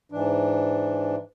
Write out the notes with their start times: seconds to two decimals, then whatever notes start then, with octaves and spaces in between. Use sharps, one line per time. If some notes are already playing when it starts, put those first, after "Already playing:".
0.12 G#2 E3 D4